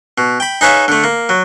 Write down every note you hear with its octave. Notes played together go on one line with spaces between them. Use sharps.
B2
G5 B5
D#4 G#4 B4 C#5 E5 F5
D3 A3
A#3
F#3